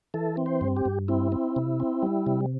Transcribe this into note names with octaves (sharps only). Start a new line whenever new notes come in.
E3 A4
C4
C5
G2
G4
G2
C4 E4
C4
C3
C4
G3
C3